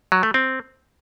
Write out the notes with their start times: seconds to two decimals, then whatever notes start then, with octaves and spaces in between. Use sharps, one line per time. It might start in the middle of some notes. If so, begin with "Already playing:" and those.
0.12 F#3
0.23 A3
0.34 C4